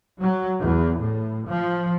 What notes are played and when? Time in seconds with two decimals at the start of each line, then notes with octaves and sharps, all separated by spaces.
0.21 F#3
0.61 E2
1.01 A2
1.46 F3